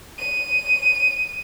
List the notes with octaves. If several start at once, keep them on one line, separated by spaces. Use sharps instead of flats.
D#7